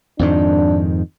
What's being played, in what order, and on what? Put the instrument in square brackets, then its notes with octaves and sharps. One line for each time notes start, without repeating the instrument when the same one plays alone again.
[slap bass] F2 G#2 D#3 [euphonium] D4